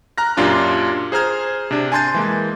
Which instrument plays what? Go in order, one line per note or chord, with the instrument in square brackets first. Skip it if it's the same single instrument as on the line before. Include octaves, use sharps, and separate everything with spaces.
[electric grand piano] A#5 F6 F#6 A#6
F#2 A#2 D4 F4 G4 A5
G#4 C5 A#5 F6 G#6
C3 D4
G#5 A5 C6 G6 A6
E3 G#3 A#3